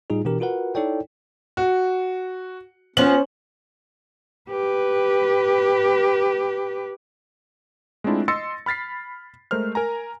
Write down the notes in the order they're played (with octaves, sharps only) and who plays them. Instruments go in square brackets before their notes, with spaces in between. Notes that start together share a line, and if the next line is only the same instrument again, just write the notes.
[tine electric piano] A2 G3 D#4 F4 G#4
B2 E3 D4 G4 A#4
F4 F#4 A#4 B4 F#5
D#4 E4 A4 C#5 D5 G5
[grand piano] F#4
[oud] F3 B3 [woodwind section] C#4 [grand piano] C5 F#7
[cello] G4 B4
[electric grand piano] G#3 A3 C4 D4 E4 F4
D#5 C6 E6 A6 A#6 C#7
B5 F6 A6 B6 C7
G#3 A3 A#4 C5 F6
A#4 G#5 A#5